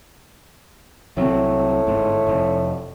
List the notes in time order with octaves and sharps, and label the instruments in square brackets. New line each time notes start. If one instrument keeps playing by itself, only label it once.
[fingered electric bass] C2 F#3 C4 [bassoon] A2
[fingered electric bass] G1 G#2
F1